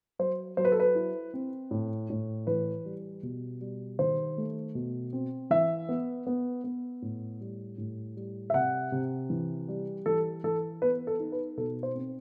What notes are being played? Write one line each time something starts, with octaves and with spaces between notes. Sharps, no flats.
F#3 C5
F#3 C5
B4
A4
B4
E4
C4
A2
A2
E3 B4
G3
B2
G3
D#3 C5
A3
B2
C4
E3 E5
B3
B3
B3
A2
G3
A2
G3
E5
C3 F#5
C3
E3
G3
E3 A4
E3 A4
B3 B4
A4
D#4
B4
B2 A4
C5
C4